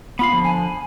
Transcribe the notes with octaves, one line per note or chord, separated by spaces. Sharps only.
B3 F4 F5 B5
D3 F3
G#5